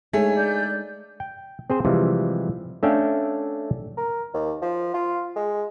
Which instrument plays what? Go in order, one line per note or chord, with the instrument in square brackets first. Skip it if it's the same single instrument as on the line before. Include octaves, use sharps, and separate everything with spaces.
[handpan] G#3 D4 D#4 [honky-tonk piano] A3 [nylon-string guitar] G#4 [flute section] C#5
[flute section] D5 G6
[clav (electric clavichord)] G5
C4 G#4 C5
C3 E3 F3 G3 G#3
A3 C#4 D4 E5 F5 G5
[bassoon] A#4
D#2
F3
F4
G#3